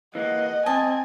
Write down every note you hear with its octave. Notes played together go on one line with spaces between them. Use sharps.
E3 A#3 D#5 F#5
C4 D#5 G#5 A5